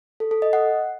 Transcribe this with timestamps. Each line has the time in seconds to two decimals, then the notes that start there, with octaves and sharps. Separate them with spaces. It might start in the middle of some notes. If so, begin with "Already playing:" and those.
0.20 A4
0.31 A4
0.42 D#5
0.53 F#5